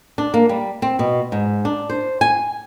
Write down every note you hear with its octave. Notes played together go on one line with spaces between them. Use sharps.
D4
A#3
G3
C4
B2
G#2
D4
C5
G#5